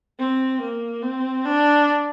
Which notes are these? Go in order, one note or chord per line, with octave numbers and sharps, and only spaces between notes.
C4
A#3
C4
D4